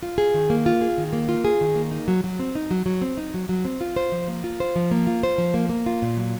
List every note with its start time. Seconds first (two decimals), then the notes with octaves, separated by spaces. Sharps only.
0.03 F4
0.18 G#4
0.34 D#3
0.50 A#3
0.66 F4
0.81 G#4
0.98 D#3
1.13 A#3
1.29 F4
1.45 G#4
1.61 D#3
1.75 A#3
1.91 D#4
2.08 F#3
2.24 F#3
2.39 C4
2.55 D#4
2.71 F#3
2.86 F#3
3.02 C4
3.18 D#4
3.34 F#3
3.49 F#3
3.65 C4
3.81 F4
3.96 C5
4.12 F3
4.28 A#3
4.44 F4
4.60 C5
4.76 F3
4.91 A#3
5.07 F4
5.23 C5
5.38 F3
5.54 A#3
5.69 A#3
5.86 F4
6.02 A#2
6.17 F#3